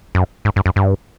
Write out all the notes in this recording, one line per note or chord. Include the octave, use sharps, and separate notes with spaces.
F#2
G#2
G2
F#2
G2